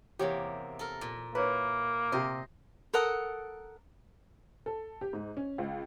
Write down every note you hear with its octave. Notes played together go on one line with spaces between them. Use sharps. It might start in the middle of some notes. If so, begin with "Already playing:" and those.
E2 C3 A#3 G4 C#5
A4 A#4
A#2
A#3 E4 B4 C#5
C3 G4 C5 D#5
A4 A#4 F#5 D#6
A4
G4
G#2
C#4
C#2